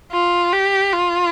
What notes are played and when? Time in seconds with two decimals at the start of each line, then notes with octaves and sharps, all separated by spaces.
0.12 F4
0.52 G4
0.93 F4